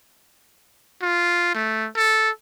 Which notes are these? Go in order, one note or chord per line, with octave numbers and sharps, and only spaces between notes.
F4
A3
A4